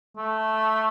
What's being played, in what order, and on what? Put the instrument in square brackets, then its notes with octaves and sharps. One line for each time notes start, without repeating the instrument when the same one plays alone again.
[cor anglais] A3